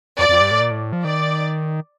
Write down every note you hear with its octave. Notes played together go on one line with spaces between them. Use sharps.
F2 D5
F2
G2
A2
A#2
A2
F3
D#3 D5